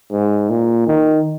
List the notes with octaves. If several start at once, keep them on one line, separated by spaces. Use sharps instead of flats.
G#2
A#2
D#3